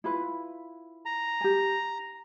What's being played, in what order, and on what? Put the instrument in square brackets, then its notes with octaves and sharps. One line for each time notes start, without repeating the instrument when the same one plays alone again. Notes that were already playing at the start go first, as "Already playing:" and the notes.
[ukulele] E4 F4 B4
[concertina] A#5
[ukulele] G4 G#5